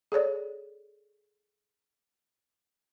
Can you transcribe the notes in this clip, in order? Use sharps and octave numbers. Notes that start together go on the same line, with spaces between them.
G#4 A4 C#5 D5